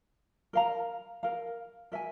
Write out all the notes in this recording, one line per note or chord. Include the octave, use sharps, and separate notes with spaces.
A#4 F5 A#5
A#4 F5 A#5
A#4 E5 G#5